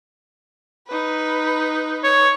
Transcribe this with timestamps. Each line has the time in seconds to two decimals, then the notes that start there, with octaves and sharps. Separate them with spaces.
0.88 D#4 B4
2.04 C#5